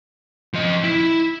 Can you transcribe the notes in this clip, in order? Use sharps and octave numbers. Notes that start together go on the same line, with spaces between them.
F3 D#5
E4